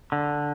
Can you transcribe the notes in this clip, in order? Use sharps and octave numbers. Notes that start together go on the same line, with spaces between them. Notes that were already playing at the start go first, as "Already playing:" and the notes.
D3